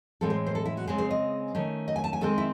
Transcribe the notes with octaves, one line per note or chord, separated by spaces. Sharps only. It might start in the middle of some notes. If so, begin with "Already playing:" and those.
A2 E3 G#3 C4 A4
C5
C5
A4
E4
F#4
C#3 G#3 C4 G#4
C5
D#5
D#3 A3 C#4
D#5
G#5
A5
G#5
D#3 G#3 C4 A4
E4